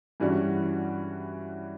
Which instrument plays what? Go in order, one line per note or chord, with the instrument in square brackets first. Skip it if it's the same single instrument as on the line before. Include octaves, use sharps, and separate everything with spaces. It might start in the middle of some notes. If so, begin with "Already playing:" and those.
[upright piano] G2 E3 G3 C#4 F#4